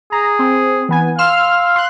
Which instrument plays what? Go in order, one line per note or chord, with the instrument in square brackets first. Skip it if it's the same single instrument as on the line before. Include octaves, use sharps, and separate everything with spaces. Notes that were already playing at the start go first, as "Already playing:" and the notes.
[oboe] G#4 [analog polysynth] A#5
[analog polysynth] C4
E3 B3 G#5
[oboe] F5 [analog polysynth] C6 E6 F6
[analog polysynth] C6 F#6